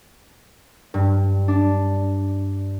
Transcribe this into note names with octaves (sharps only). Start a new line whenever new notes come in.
G2
D4